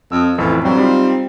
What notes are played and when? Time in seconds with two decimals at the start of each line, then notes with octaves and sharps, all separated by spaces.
0.12 F2 D#6 E6
0.38 A1 F2 E3 A4
0.64 G2 F#3 G3 C4
0.77 G3 D#4 F4